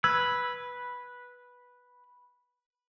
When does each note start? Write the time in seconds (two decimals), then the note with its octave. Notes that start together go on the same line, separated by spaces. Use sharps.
0.04 B4 E6 G#6